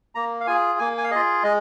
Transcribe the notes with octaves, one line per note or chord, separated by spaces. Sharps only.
A#3 A#5
F5
F4 G#4 G#5
A#3 G#5
G#5
F5
F4 G#4 D#5
G#3 D#5